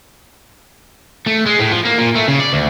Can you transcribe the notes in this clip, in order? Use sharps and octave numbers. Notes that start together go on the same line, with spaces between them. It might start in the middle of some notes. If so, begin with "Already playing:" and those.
A3
G#3
A2
F3
A#3
A#2
A3
C#3
D5
D2